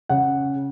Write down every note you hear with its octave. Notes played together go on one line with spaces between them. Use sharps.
C#3 F#5